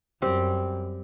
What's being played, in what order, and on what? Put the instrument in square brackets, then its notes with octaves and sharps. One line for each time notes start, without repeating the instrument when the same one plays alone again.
[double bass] F#2 [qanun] G3 C4 G4